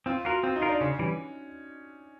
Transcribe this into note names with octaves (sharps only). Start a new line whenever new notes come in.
C4 F4
F4 F#4 A#4
C4 F4
D#4
F4 A#4
D4
C#3 C#4
E3 G3